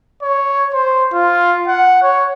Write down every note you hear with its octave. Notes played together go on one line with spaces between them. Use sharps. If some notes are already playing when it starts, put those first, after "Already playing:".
C#5
C5
F4
F#5
C#5